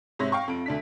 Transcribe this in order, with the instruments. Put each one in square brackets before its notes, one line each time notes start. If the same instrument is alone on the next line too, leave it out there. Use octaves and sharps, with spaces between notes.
[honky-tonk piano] G#2 C3 C#5 E5 A#6
F5 G5 C#6
F2 D7
D2 D4 B6